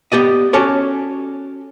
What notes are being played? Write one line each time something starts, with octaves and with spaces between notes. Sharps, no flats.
B3 G4 D5 D#5
C#4 F#4 A4 C#5 D5